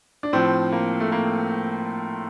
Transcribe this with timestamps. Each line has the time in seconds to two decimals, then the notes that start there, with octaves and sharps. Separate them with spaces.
0.23 D4
0.33 A2 F3 C4
0.72 A#3
1.00 A3
1.12 A#3